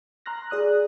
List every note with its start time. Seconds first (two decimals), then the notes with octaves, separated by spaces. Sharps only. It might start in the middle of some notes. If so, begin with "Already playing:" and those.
0.26 A#5 C6 F6 F#6 A#6
0.50 G#4 D5 D#6 F#6